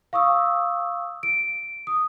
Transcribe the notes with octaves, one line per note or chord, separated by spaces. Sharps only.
F5 C#6 D#6 E6
D7
D#6